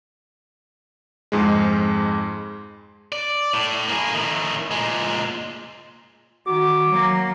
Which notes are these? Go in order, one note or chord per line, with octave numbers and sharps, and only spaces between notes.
F2 G#2 G#3
D5
A2
A#3 G#4
A2 D#3
A#2 G#3
D#3 F#4 D6
F#3 A#3